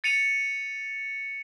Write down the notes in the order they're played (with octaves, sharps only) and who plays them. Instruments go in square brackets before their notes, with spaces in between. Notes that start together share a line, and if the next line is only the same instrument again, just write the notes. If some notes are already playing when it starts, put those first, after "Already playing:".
[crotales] A6 C#7 D#7 F7